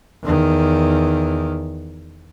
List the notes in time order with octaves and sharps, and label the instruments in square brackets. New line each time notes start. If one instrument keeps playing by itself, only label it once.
[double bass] E2 D#3